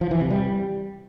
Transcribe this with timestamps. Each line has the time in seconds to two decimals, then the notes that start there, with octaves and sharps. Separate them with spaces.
0.01 F3
0.11 E3
0.21 C3
0.30 G3